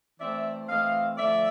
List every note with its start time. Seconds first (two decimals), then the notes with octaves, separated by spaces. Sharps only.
0.20 E3 A3 C4 D5 E5
0.69 E3 A3 C4 D#5 F5
1.18 D3 F3 A3 D5 E5